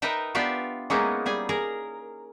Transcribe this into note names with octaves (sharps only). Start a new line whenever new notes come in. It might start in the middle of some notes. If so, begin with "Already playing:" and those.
D#4 A#4 B4 D#5 E5 G5
B3 D4 F4 G4 D5 E5
G#3 A#3 B3 C#4 D#4 E4
G3 G#4 G#5
G#4 A#4